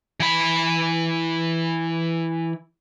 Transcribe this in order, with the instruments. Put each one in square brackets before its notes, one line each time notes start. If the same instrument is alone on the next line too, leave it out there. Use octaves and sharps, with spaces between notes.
[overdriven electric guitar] E3 B5